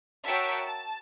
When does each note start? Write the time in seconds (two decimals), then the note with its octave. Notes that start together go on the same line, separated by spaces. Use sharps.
0.25 F#4 A#4 C#5 E5 G5 A5
0.65 A5